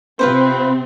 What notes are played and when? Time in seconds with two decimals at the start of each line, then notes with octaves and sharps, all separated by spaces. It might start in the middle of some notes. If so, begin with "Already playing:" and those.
0.19 C3 C4 F4 B4 C5